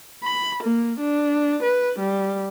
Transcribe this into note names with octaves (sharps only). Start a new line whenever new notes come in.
B5
A#3
D4
B4
G3